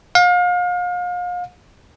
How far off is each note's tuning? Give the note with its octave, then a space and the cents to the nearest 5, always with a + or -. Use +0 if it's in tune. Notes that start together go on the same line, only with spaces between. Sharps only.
F5 +35